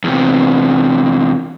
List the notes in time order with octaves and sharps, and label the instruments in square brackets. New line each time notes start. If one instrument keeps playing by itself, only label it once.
[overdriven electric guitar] E2 C3